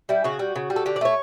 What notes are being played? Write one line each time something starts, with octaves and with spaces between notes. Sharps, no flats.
G3 E4
C#3 F#4
G3
C#3
G3
A4
D3 G4
D5
A3 C#5